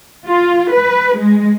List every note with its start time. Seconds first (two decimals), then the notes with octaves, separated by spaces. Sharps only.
0.27 F4
0.72 B4
1.18 G#3